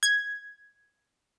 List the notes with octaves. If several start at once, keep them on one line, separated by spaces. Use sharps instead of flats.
G#6